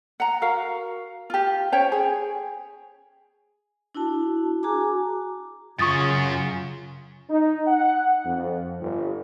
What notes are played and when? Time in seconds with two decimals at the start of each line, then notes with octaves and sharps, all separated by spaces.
0.20 F#5 A#5
0.42 F#4 A#4 F5
1.30 F4 G4
1.72 C#4 C5 C#5 G5
1.92 G#4
3.95 D4 E4 F#4 A5
4.63 F#4 G#4 G#5 A#5 D6
5.79 F#2 C#3 C#4 F4 C#6 D#6 A6
7.29 D#4
7.67 F#5
8.24 F2
8.81 G1